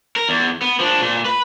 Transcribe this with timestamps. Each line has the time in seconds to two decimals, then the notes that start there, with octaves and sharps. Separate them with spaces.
0.16 A#4
0.29 E2
0.61 B3
0.80 F3 D4
1.02 A#2
1.25 B4 B5